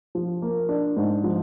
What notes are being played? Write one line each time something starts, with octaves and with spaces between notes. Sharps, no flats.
F3
A#3
D4
G#2
F3